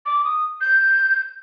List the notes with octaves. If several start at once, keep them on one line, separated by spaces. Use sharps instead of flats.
D6
D#6
G6